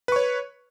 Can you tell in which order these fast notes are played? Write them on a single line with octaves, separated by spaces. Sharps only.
B4 C#6 C#5